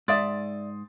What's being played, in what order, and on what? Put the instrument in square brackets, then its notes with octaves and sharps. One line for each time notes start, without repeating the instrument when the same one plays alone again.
[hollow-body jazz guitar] G#2 [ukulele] D5 E5 [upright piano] C6 D#6 A6